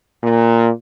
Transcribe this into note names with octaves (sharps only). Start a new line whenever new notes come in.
A#2